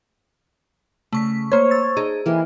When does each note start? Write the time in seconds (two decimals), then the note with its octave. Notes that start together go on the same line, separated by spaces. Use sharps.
1.13 C#3 A3 C#6 B6
1.52 A#3 C5 C#5 G#6
1.71 E6 A6
1.97 D#4 G#4
2.26 E3 A#3 D#4 G4